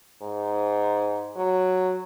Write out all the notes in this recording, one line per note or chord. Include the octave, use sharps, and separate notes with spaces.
G#2
F#3